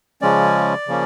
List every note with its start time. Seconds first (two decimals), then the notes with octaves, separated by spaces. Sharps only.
0.22 C#3 F3 G#3 C#4 D5
0.88 C#3 F3 A#3 C#4